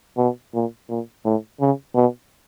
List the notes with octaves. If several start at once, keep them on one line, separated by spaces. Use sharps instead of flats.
B2
A#2
A#2
A2
C#3
B2